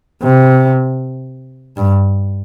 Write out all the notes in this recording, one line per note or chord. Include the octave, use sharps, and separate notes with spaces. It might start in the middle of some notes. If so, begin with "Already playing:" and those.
C3
G2